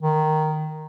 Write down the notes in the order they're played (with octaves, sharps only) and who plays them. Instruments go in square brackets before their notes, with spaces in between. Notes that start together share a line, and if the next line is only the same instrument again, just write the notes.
[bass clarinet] D#3